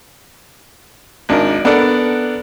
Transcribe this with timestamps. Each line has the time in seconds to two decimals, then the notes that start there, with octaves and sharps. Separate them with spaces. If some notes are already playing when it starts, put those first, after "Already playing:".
1.29 G#1 D4 D#4 A#4
1.65 B3 D4 A4 A#4 D5 F#5